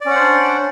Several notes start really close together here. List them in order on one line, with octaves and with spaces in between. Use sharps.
D5 C#4 F#5 C5 D4